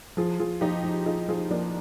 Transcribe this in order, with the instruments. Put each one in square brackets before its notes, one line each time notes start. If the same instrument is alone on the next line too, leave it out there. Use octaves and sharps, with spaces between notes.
[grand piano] F3 [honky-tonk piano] F4 G#4
[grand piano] F3 [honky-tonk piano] F4 G#4
[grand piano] F3 [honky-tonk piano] D#4 G4
[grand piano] F3
[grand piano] D#4 [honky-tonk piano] F4 G#4
[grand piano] F3 [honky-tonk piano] F4 G#4
[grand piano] F3 [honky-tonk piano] A#3 D4